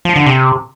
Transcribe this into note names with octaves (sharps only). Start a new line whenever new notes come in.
F3
D3
C3